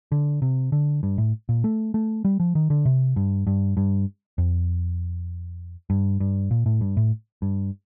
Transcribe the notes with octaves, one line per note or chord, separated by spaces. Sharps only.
D3
C3
D3
G2
A2
A#2
A3
A3
G3
F3
D#3
D3
C3
G2
G2
G2
F2
G2
G2
A#2
A2
G2
A2
G2